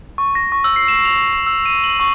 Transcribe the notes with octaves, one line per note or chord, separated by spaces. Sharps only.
C#6
A#6
C#6
E6
C7
E7
F7
E7
E6
D#7
F#7
C#6